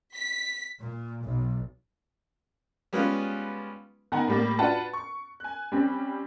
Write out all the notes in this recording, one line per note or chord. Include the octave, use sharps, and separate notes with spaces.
B6
A#2
B1
G3 G#3 B3 C#4 F4 B4
D#3 B3 F#5 G#5 A#5
A2 G3 A#3
D4 F4 F#4 B4 F#5 A5
C#6
G#5 F#6
G3 C4 C#4